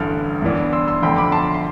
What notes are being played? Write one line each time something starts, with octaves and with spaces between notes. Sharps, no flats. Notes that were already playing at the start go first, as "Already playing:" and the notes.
Already playing: A1 G2 D3 F6
G2 E3 B3 D4
C6 E6
C6 E6
F1 F2 D3 G5 B5
B5 D6
A5 C6
C6